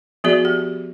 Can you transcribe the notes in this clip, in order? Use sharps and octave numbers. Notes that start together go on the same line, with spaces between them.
F3 B3 F#4 G#4 D5
G4